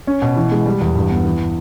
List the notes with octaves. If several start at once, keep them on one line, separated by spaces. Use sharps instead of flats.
C#4
B2
E3
G#3
G3
E2
G2
B3
E3